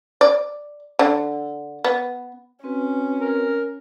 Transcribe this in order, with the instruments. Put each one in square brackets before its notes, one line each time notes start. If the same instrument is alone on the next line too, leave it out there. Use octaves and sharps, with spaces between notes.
[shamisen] D5
D3
B3
[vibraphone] C4 F#4 B4 [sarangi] C#4
[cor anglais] A#4